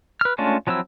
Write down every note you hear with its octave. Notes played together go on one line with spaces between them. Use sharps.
B4 F6
G#3 A3 C#4 D4 F4
F3 F#3 C4 E4 E6